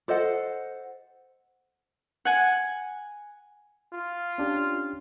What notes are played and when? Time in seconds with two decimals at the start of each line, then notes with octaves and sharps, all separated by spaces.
0.08 A4 C5 D#5 F#5
2.25 F#5 G#5
3.93 F4
4.38 C#4 D4 G4